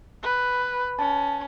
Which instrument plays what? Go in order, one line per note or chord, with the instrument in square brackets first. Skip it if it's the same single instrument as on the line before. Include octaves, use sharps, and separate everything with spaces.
[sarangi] B4
[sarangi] C#4 [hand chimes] A5